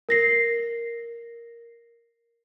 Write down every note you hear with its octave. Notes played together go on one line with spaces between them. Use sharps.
A#4 A#6 C7